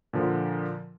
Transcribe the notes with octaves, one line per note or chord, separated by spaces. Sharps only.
A#2 D3 F3